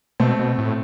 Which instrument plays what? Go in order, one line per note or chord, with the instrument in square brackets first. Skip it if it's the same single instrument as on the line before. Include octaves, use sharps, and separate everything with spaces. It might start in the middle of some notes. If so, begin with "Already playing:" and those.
[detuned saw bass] B2 [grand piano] A3 C4
[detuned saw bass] B2
A2